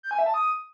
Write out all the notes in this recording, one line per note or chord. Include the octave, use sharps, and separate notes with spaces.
G6
G#5
E5
A5
D#6